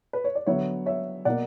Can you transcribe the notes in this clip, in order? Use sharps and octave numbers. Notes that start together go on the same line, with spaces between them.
B4
C#5
D5
D3 F#3 B3 C#5 E5
C#5 E5
B2 A#3 D5 F#5